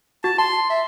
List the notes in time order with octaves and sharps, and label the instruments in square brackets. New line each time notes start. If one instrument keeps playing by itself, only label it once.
[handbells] F#4 [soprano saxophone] A5
[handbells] A5 [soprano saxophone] C6
[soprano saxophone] E5